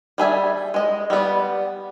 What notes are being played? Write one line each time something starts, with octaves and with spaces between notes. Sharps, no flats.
G3 G#4 E5 G#5
G#3 D#5
G3 B3